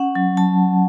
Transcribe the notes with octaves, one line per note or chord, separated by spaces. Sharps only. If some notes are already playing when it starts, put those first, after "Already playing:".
Already playing: C#4 F#5
F#3
F#3 A5